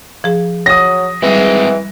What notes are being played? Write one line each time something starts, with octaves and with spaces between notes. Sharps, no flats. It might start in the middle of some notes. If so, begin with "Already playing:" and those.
F3 G#4
F#3 D#6 A#6
E3 G3 G#3 C4